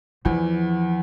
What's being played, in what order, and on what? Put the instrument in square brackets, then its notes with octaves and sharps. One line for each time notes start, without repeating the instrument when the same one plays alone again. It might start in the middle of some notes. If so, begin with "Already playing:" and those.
[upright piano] E2 E3 [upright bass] F3